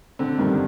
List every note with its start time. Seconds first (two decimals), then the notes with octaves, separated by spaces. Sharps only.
0.19 D3 C4
0.39 G2 D#3